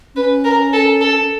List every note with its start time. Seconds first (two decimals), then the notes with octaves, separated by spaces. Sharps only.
0.15 C#4 B4
0.44 A#4
0.73 A4
1.01 A4